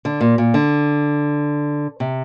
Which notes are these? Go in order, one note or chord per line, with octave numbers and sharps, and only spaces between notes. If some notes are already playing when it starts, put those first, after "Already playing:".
D3
A#2
A#2
D3
C3